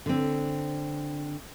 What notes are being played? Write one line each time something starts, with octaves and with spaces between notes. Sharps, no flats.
D3 C4